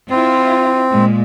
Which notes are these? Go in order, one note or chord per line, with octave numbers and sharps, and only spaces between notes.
C4 E4 F4
A#2 G#3